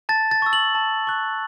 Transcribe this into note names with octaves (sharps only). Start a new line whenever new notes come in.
A5 A6
A6
C#6 E6
F#7
A5
C#6 F#6